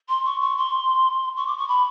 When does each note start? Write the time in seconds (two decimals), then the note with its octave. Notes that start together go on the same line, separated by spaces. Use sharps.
0.08 C6
0.25 C#6
0.41 C#6
0.57 C6
1.36 C#6
1.47 D6
1.57 C#6
1.68 B5